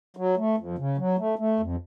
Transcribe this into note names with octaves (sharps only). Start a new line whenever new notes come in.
F#3
A3
F2
C#3
F#3
A3
A3
F2